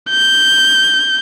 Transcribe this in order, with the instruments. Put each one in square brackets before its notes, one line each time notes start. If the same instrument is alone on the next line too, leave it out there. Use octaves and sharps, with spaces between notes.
[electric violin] G6